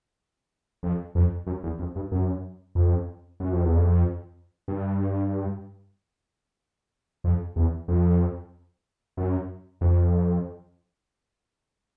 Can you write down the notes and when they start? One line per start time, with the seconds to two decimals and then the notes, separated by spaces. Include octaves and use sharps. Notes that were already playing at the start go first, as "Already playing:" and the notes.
0.83 F2
1.15 F2
1.47 F#2
1.63 E2
1.79 F2
1.96 G2
2.11 F#2
2.75 F2
3.40 F#2
3.52 F2
3.64 E2
3.76 F2
4.68 G2
7.24 F2
7.56 E2
7.88 F2
9.17 F#2
9.81 F2